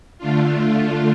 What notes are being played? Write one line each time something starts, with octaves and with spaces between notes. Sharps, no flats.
D3 A3 D4 F4